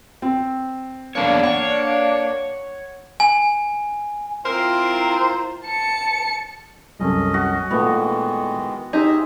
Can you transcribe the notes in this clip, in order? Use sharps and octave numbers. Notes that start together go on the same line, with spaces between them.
C4
E2 A#3 B3 D4 C#5
C#5 F#5
G#5
C4 E4 F4 A#4 C5 A#5
A5 C#7
C2 F#2 C#4 A4 D#5
F#4
A#2 D#3 E3 G#3 A3 B3
D#4 G4 G#4 C5 E5